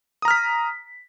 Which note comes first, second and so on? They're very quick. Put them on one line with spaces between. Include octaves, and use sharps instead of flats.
D#6 A#5 F6 B6